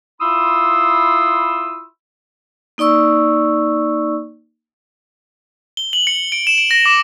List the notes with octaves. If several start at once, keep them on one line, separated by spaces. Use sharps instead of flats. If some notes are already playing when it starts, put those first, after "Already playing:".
E4 F4 B5 C6 D#6 E6
A#3 D#4 D5 C#6 E6
G7
F#7
C#7
D7
E7
D7
A#6
D6